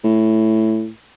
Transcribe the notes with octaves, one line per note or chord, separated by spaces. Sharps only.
A2